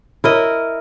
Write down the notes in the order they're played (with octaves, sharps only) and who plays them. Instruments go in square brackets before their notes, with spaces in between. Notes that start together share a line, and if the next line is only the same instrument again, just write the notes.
[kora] E4 A#4 D#5